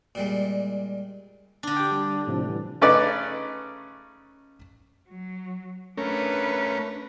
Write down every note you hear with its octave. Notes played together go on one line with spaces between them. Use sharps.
A#2 G3 G#3
D3 D4
G4 G5
G3
A2 C3 F3
E3 G3
C#3 A3 C#4 D#4 B4 D5
F#3
A3 C#4 D4 A#4 B4